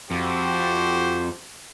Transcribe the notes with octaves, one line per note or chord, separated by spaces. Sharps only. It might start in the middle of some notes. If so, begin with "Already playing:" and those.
F2 F#4 G4 C5